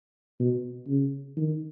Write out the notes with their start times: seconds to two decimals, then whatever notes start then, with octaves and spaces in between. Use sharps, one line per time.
0.40 B2
0.88 C#3
1.37 D#3